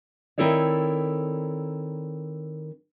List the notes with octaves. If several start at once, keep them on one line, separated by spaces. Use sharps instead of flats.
D#3 C4 E4 A4 C#5 D5